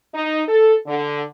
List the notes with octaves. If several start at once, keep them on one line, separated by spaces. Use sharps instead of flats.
D#4
A4
D3